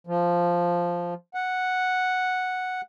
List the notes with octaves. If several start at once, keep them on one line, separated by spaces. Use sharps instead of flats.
F3
F#5